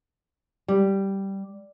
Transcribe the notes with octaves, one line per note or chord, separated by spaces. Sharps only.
G3